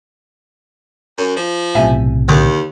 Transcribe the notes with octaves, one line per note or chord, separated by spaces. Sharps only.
F#2
F3
B1 A2 C3 E5 G#5 A5
D#2 D3 D#6 G6